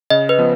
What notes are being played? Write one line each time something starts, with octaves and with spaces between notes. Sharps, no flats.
C#3 D#5
B4
F3 B3